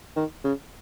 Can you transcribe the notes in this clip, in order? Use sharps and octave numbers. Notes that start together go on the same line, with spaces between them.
D#3
C#3